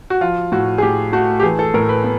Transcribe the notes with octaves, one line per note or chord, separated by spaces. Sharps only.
F#4
F3 F4
A2 F#4
G#4
A2 G4
A3 F#4
G4
E3 G#4
A4
A2 A#4
B4
B3